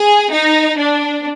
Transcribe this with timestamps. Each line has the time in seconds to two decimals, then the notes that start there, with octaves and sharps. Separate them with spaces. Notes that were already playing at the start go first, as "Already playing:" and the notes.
Already playing: G#4
0.32 D#4
0.78 D4